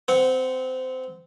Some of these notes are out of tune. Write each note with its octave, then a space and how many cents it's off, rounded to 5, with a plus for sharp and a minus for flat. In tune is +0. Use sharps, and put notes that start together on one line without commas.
C4 -20 F#5 +0